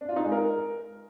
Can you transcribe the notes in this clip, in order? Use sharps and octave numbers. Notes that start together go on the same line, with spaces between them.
D4
F4
D#4
G#3
A#4